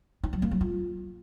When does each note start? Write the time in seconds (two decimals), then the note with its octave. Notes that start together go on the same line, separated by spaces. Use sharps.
0.23 D#4
0.33 F#3
0.42 A#3
0.51 F#3
0.61 F4